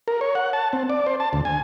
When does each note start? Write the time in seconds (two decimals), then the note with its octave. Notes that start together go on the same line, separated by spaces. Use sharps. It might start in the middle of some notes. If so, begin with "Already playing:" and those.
0.08 A#4
0.21 C#5
0.35 F#5
0.53 A5
0.73 C4
0.90 D5
1.06 C5
1.20 A5
1.33 D2
1.45 G#5